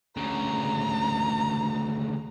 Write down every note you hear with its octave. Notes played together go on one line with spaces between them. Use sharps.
D2 C#3 A#5